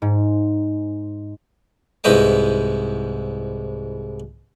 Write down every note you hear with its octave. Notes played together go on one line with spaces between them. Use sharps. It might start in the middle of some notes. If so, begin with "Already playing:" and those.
G#2
C2 G#2 E4 B4 D#5 G5